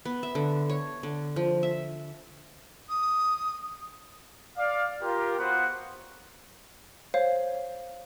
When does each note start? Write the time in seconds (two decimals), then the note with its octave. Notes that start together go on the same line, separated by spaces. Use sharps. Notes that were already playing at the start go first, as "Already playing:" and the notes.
0.05 B3
0.23 E5
0.35 D3
0.69 C#5
1.03 D3
1.36 F3
1.63 E5
2.89 D#6
4.57 D5 F5
5.01 F4 G4 A#4
5.38 B3 F4 F#4 B4 C5 F#5
7.14 C5 C#5 F5